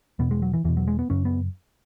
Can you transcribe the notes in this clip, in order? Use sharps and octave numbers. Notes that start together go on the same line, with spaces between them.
E2 B2 B3
G#3
F#3
E3
E2 B2 E3
F#3
G#3
B3
F#2 C#3 C#4
B3